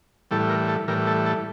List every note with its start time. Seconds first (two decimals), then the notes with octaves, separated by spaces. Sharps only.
0.31 A2 E3 G3 A4
0.50 A#4
0.68 A4
0.88 A2 E3 G3 A#4
1.07 A4
1.26 A4